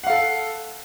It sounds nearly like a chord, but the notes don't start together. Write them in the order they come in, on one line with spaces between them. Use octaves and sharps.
F#5 F5 A4